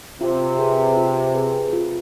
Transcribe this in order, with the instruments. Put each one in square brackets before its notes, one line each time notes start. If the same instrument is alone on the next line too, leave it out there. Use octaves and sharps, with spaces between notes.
[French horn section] C3 [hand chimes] F4
[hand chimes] G#4 B4
F4
G#4 B4
F4